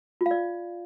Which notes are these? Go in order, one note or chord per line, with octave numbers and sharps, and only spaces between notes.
F4
F5
D5